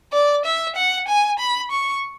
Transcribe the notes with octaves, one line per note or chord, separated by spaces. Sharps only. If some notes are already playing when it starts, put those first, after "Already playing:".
D5
E5
F#5
G#5
B5
C#6